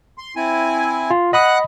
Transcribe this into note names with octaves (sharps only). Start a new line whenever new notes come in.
C6
C4 E4 G#5
F4
D#5 F#5 B5 D#6 F#6